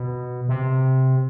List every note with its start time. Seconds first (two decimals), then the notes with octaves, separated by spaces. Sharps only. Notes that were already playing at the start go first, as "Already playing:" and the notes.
Already playing: B2
0.49 C3